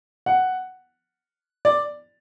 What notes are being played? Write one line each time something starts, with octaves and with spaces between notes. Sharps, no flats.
F#5
D5